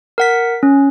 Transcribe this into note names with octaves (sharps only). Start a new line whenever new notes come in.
A#4 F#5 B6
C#4